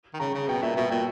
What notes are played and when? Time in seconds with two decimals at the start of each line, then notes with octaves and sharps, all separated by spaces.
0.14 D#3
0.20 C#3 A#5
0.34 C#3
0.48 B2 G5
0.62 A#2 E5
0.76 B2 E5
0.90 A#2 G5